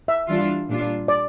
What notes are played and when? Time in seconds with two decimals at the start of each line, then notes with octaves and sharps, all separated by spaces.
0.08 E5
0.28 E3 G3 D4 F4
0.68 A#2 G3 D4 F4
1.08 D5